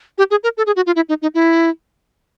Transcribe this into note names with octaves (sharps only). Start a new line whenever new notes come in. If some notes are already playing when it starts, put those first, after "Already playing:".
G4
G#4
A#4
A4
G#4
F#4
F4
E4
D#4
D#4
E4